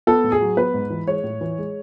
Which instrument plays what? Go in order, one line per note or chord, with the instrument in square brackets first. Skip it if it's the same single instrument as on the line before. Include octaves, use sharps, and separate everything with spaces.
[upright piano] B3 A4
A2
G#4
F#3
B3 B4
G#2
E3
G#3 C#5
A2
E3
G#3